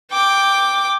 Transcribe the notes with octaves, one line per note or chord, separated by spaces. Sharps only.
G5 D6